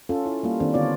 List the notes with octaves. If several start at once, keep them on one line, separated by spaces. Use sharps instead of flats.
C#4 F4 A4
E4
G3 A#3 F4
D#3 C4 D4 A4
D3 B3 F4 C#5 D5